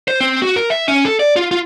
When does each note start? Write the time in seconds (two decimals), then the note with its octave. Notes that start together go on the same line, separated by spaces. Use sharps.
0.08 C5
0.20 C4
0.42 F#4
0.56 A#4
0.70 E5
0.88 C#4
1.05 A4
1.19 D5
1.36 F4
1.51 F4